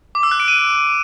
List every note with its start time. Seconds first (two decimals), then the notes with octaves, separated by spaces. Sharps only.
0.15 D6
0.23 E6
0.31 F#6
0.40 D7
0.48 D#7